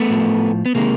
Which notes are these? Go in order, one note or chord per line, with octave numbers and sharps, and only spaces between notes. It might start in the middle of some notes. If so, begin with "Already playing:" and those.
Already playing: A3 B3
A2 F3
B3
C3 D#3 G#3 A#3